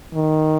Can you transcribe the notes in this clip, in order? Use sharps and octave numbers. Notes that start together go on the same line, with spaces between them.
D#3